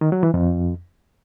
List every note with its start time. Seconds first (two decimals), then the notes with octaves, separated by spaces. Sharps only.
0.01 D#3
0.12 F#3
0.23 E3
0.34 F2